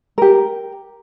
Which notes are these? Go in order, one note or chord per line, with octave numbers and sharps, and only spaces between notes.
G4 A#4